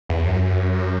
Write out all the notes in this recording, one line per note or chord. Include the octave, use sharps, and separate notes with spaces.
E2
F#2